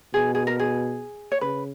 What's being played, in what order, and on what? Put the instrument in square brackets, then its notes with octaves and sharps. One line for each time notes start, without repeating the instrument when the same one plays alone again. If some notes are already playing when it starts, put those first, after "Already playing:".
[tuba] B2 [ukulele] G#4
[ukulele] G#4
A#4
G#4
C#5
[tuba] C#3 [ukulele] B4